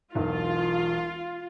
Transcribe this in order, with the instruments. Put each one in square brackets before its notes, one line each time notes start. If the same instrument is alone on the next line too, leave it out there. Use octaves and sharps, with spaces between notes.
[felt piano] E1 B1 E2 [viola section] F4